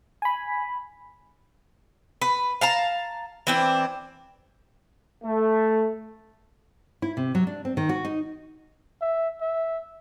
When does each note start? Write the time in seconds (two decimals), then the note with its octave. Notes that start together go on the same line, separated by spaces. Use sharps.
0.22 G#5 B5
2.22 B4
2.61 F5 A5 A#5
3.47 E3 C4 D4
5.24 A3
7.02 E4
7.17 C3
7.35 F#3
7.47 D4
7.65 C4
7.77 D#3
7.89 F#4
8.05 D#4
9.01 E5
9.41 E5